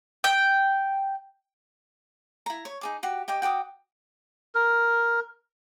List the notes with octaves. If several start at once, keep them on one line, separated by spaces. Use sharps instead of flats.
G5
E4 A#5
C#5
D#4 G#4 D6
F#4 G4
G4 D#5 G5 D6
F#4 G5 D6 D#6
A#4